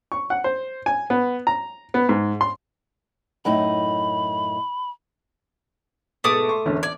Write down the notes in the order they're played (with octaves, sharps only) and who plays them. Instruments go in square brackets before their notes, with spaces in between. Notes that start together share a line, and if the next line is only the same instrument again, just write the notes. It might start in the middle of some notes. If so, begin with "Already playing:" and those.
[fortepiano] C#6
F#5
C5
G#5
B3
A#5
B3
G#2
C6
[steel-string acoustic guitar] F#2 A2 D#4 [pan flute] B5
[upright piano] G#2 B2 [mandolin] A3 D6 D#6
[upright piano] C6 C#6
E1 D3 C#4
[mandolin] D5 [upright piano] G#6